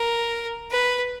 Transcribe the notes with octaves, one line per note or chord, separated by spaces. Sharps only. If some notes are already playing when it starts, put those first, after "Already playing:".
Already playing: A#4
B4